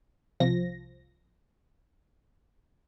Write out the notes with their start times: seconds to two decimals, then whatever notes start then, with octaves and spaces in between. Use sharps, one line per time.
0.40 C2 F3 A#6